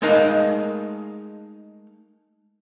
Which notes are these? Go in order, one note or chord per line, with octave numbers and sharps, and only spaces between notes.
G#3 A3 D#4 A#4 F5